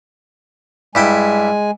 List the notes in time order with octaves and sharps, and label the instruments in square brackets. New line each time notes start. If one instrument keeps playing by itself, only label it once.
[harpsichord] G2 E4 G5 [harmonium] G#3 G#5